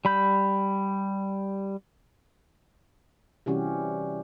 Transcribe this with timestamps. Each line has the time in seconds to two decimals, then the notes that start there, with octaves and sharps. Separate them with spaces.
0.05 G3 B5 G6
3.46 C3 E3 G3 C#4 F#4 G4